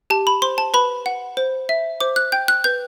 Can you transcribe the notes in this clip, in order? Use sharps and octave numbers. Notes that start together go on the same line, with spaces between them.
G4 A5
B5
C5 C6
A5
B4 B5
F#5
C5
E5
C5 D6
F#6
G5 G6
F#6
B4 G6